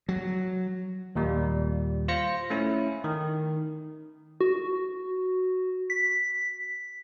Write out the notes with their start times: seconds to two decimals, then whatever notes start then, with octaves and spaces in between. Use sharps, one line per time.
0.09 F#3
1.15 D#2 A#2 G3
2.08 F4 C5 A#6 C#7
2.50 A3 C#4 E4
3.04 D#3
4.41 F#4
5.90 B6